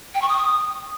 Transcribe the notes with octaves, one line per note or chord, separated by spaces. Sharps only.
G5
C#6
D#6